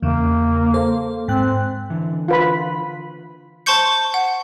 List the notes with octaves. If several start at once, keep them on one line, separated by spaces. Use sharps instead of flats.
E2 C#3 A#3
A4 C5
G#2 C4 G5 F#6
D3 E3
F4 B4 B5
C5 A5 C6 C#6 G6 C#7
F#5